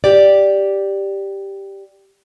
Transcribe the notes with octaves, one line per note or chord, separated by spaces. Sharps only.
G4 D5